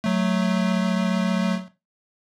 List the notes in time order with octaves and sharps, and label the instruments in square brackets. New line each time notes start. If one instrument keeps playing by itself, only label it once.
[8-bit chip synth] F#3 A3